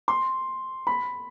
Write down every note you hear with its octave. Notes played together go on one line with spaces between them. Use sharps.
C6
B5